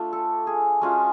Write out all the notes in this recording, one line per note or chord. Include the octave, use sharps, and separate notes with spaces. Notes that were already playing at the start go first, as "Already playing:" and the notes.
Already playing: A3 D4 F4
A4
G#4
G#3 C#4 F4 F#4